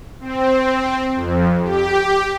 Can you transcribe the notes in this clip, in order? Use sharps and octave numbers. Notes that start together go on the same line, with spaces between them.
C4
F2
G4